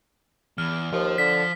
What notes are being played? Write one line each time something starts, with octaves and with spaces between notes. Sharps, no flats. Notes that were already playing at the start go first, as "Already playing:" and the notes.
E2 F6
D#2 F3 C5
D3 B6